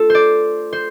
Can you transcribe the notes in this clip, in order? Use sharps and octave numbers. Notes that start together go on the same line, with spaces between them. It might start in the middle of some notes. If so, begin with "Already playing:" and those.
Already playing: A3 D4 F4 A4
C5 D5
C5